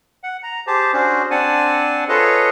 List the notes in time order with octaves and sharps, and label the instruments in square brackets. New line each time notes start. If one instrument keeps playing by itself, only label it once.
[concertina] F#5
A#5
G4 G#4 C5 A5
C#4 D4 F#4 G#4 C5
C4 D4 F#5 G#5 A5
F4 G#4 A4 B4 C#5 D#5